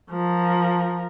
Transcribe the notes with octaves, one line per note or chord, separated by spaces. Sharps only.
F3 A#4